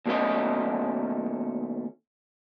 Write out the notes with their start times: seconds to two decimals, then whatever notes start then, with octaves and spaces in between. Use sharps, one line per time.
0.06 D#2 B2 G#3 A3 C#4 D#5